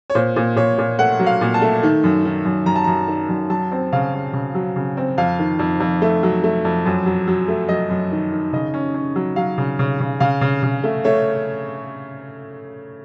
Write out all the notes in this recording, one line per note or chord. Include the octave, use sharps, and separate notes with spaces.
C#5
A#2 C5
A#2
A#2 C#5
A#2
A3 F#5
F#3
F5
A#2
A5
A3
D#3
F#2
D#3
F#2
F#2 A#5
A5
F#2 A#5
D#3
F#2
F#3 A5
C4
C#3 F5
C#3
C#3
F#3
C#3
C4
F2 F5
D#3
F2
F2
A3
F#3
A3
F2
F#2
F#3
F#3
A3
F#3 D#5
F#2
D#3
D#3
C#3 D#5
C#4
C#4
F#3
F#3 F5
C#3
C#3
C#3
C#3 F5
C#3
C#3
A3
A3 C#5